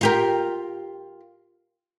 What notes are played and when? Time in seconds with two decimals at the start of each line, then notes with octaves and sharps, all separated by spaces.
0.01 F4 G4 A#4